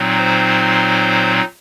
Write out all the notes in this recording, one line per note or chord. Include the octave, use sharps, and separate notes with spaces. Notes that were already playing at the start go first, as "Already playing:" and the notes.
Already playing: A#2 F#3 C4 D#4
C5